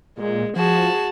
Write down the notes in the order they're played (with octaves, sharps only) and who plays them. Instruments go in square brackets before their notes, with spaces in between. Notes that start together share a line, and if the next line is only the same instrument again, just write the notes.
[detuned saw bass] A#2 [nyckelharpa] G#3
[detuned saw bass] F3 [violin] F#4 A5 [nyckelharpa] G#4